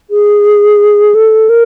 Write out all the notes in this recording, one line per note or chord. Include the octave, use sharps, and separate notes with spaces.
G#4
A4
A#4